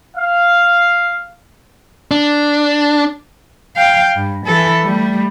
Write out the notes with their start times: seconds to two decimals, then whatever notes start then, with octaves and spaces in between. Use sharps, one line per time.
0.16 F5
2.11 D4
3.76 F5 G5
4.16 G2
4.46 E3 A4
4.83 G3 A3